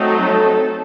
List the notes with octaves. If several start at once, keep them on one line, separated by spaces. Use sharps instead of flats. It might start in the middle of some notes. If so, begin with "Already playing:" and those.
Already playing: F#3 A3 C4 D#4
A4